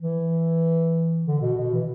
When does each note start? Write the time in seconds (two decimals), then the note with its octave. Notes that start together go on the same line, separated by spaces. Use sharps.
0.01 E3
1.26 D3
1.41 B2
1.57 B2
1.73 E3